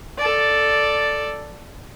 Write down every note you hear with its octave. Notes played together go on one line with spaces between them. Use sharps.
A4 D5